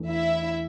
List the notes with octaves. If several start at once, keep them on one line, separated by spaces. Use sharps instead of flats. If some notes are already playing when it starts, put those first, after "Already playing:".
Already playing: E2 E3 A3 D4
E4 E5